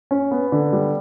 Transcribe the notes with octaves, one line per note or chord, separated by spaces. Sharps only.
C#4
B3
D3
G3